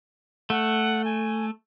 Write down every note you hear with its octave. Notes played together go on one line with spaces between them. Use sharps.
A3 F#5
G#5